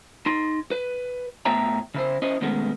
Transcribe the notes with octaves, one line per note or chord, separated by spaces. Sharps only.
D#4 C6
B4
A2 B3 C#5 E5 G5 A#5
C#3 E4 C5
C#4 E4 C5 D#5
D#2 B2 G#3 A3 B3 C#4